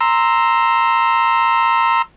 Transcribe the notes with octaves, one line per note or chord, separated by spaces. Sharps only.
A#5 C6 E6